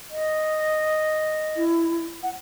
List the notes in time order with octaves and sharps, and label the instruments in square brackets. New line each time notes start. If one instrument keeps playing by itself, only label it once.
[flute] D#5
[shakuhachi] E4
[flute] F#5